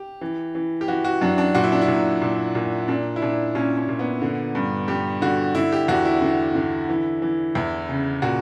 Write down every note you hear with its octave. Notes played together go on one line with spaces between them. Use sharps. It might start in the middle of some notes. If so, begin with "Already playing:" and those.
Already playing: G4
E3
E3
G4
E3 F#4
F#4
F#2 D4
D4
A#2 F#4
E4
D4
E4
A#2
A#2
A#2
A#2 D4
E4
A#2 D4
A#2 C#4
C#4
A#2
B3
D3
G2
G2 G4
D3 F#4
D3 E4
G4
E2 F#4
E4
D3
D3
E3
E3
E2 E4
C#3
A#2 F#4